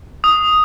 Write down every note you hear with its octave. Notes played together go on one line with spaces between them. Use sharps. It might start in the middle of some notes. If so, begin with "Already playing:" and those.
D#6